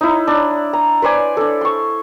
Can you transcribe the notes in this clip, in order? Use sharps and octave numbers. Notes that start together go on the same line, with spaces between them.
D#4 E4
D4
A#5
B4 C5 D5 G#5
D4 A4
C6 C#6